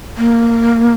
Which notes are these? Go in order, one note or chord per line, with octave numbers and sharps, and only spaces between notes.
A#3